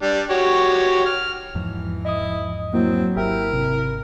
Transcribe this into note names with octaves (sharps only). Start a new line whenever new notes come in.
G3 D4
F#4 G4 C#5
F6
E2 G#2 E3 F3
E4 D#5 D#6
F#3 A#3 C4 E4
G#1 E4 G4 A#4 E5 G5
G#1 C3